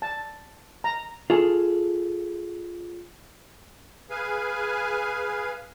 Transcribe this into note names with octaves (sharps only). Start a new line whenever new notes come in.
A5
A#5
F4 G#4 A4
G#4 B4 F5 G#5